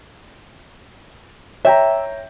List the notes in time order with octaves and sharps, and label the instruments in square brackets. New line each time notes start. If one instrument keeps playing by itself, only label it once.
[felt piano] C#5 G5 A#5 [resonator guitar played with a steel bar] E5